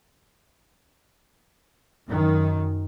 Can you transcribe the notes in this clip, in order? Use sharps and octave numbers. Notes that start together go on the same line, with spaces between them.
F#2 D#3